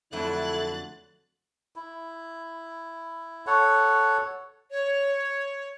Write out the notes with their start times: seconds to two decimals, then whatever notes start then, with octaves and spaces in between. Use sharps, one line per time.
0.13 F2 D3 F#3 A3 E4 F#6 A6
1.76 E4
3.47 A4 C#5 F#5
4.71 C#5